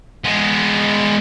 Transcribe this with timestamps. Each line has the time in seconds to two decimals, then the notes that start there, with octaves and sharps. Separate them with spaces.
0.25 G#3 B3